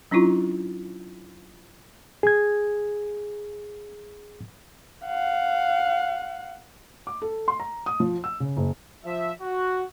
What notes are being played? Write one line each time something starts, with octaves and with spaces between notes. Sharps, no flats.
F#3 C#4 D4 E4 F4
G#4 G#6
F5 F#5
D6
A4
C6
A#5
D#6
F3
E6
C#3
F#1
F3 E5
F#4